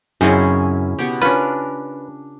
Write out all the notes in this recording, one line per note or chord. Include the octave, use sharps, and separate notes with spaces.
F#2 C#3 C4 C#4 D#4 E4 G#4
B2 B3 G4 C#6
C#4 D4 F4 A#4 B4